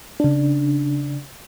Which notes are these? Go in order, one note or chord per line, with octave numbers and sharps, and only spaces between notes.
C#3 D4